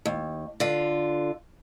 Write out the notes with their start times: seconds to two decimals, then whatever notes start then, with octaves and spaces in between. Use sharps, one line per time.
0.05 D#2
0.60 D3 F4